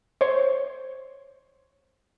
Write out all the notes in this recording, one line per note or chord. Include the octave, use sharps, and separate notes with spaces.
C5 C#5